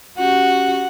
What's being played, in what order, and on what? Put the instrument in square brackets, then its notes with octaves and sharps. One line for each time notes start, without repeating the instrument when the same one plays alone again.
[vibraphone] C#4 G4 [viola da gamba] F#4 [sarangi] F#5